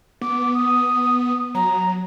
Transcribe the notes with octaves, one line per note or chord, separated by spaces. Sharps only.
B3 D6
D#6
F#3 A#5